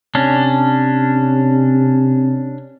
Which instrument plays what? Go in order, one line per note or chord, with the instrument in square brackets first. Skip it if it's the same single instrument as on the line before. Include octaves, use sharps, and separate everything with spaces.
[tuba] C3 [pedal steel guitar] C#4 D4